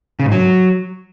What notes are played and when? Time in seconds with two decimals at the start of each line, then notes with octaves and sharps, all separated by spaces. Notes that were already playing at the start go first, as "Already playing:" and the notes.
0.19 C#3
0.26 G#2
0.32 F#3